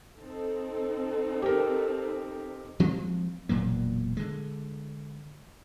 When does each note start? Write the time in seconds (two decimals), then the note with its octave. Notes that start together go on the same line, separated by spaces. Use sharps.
0.18 C4 D#4 A4
1.42 G4 A#4
2.80 F3 G#3 C4
3.49 E1 A#2 F#3 A#3
4.17 D3 G#3